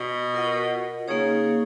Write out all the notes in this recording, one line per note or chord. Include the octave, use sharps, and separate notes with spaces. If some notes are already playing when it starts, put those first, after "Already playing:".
Already playing: B2
F4 A#4 D#5 F#5
C#3 A#3 D#4 G#4 C#5